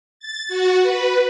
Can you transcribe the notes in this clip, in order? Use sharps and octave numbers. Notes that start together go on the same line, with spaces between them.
A6
F#4
B4